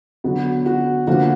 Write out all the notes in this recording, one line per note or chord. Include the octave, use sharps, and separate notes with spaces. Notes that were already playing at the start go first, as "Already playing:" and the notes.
D3 F#3 B3 F#4
F#4
D3 F3 A#3 F#4